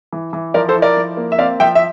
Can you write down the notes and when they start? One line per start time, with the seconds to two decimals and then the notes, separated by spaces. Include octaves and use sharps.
0.13 E3
0.33 E3
0.54 F3 A#4 D5
0.69 A4 C5
0.75 E4
0.82 A#4 D5
0.97 F3
1.17 A#3
1.32 E5
1.38 C4 D5 F5
1.60 F3 E5 G5
1.75 E5